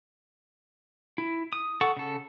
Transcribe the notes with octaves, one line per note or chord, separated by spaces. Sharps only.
E4
D#6
A4 F#5 C#6
C#3 A4